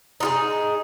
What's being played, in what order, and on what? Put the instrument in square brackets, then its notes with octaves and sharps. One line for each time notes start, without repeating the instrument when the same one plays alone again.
[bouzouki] D#4 F4 G#4